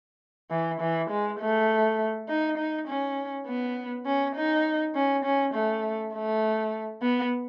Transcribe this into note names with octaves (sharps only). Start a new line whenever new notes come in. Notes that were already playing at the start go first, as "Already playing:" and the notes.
E3
E3
G#3
A3
D#4
D#4
C#4
B3
C#4
D#4
C#4
C#4
A3
A3
B3